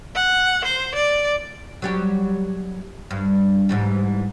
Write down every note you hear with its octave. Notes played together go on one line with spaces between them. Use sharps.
F#5
C5
D5
F#3 G3 G4
G2
G#2 E3 G3